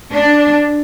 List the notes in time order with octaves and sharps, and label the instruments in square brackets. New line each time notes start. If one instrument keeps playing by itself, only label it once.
[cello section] D4